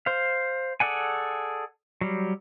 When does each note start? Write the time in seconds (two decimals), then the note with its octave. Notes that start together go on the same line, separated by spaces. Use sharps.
0.06 C5 F5
0.80 G#4 A4 D5 F#5 G#5
2.01 F#3 G3